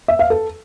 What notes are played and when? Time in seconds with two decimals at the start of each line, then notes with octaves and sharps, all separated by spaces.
0.08 E5
0.19 F5
0.30 A4